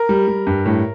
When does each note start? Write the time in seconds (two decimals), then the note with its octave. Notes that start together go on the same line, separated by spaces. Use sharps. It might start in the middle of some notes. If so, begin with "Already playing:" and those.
Already playing: A#4
0.09 G3
0.28 G3
0.47 G2
0.66 A2